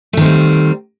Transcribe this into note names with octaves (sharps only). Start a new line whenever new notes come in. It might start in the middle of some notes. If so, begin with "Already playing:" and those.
D#3 G3 A3 C4